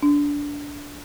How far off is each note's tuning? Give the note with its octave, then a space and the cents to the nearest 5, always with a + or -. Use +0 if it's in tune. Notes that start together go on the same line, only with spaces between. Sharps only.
D4 -20